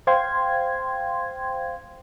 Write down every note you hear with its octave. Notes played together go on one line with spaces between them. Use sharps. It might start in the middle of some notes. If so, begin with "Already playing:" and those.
C5 F5 G5 C6 G#6